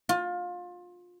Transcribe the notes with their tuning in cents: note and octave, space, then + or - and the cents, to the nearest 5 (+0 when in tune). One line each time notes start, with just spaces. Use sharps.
F4 +25